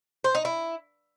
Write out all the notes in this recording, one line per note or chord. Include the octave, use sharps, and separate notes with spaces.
C5
D#4
E4